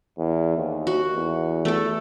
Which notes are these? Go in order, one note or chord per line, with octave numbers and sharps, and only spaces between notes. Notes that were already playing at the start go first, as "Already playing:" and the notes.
E2
D#2
F#4
E2
A3 A4